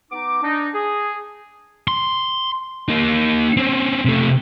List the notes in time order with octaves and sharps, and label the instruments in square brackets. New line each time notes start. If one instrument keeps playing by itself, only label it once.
[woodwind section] B3 D#4 D6
D4 D#4
G#4
[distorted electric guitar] C6
A#3 D#4
C4 C#4
C3 A3